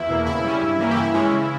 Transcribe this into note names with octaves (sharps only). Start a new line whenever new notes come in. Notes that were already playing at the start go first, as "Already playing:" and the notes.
Already playing: E2 E4
B2 A#3
C#3 E4
G3 C#4
G2
E3 A#3 C#4
G4
C#3 E4
E3 G#3 C#4
C#3